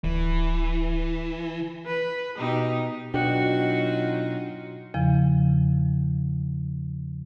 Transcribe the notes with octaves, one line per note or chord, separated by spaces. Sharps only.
D1 E3
B4
B2 D#4 G4
B2 F#3 D4 D#4 F4 F#4 G5
E2 C#3 F3